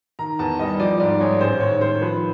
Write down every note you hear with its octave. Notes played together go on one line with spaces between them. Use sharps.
D#3 A#5
E2 A5
G3 D#5
F3 D5
G#2 D5
G#3 C#5
A1 C5
D#3 C#5
D#3 C5
F3 B4